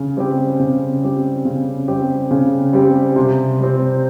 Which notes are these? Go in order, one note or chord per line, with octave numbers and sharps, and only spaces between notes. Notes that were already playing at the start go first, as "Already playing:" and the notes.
Already playing: C#3
G3 C4 G4
C#3
G3 C4 G4
C#3
G3 C4 G4
C#3
G3 C4 G4
C3
G3 C4